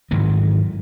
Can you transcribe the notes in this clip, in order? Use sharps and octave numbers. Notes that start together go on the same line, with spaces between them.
G#2 D#3 E3 F#3